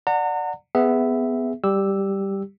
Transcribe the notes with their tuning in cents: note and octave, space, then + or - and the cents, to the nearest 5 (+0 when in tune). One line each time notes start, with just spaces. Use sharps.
D5 +5 F#5 -15 A#5 -40
B3 +15 G#4 +0 E5 +0
G3 +0 G4 +0 E6 +0